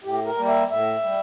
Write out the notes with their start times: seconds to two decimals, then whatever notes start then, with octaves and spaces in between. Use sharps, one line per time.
0.04 A2 G4
0.26 A#4
0.37 G3 A#3
0.48 E5
0.70 A2 E5
1.03 G3